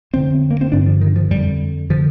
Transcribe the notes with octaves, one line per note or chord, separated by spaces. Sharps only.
F2 D3 C4
A#3
C4
G2 D3 D4
F3
D#3
F3
F2 D3 G3
D3 F3